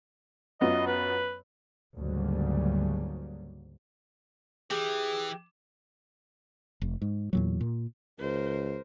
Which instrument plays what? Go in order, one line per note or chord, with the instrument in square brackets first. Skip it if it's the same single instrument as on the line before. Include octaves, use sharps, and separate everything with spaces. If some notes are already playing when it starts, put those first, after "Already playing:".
[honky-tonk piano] F#2 B3 F4 [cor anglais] D#5
[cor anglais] B4
[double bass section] D2 G#2 C#3 F#3 G3 A#3
[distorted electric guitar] E3 [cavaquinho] G4 [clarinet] G#4
[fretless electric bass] F1
G#2
E2 A#2 F#3
A#2
[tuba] C#2 [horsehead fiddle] A#4 C5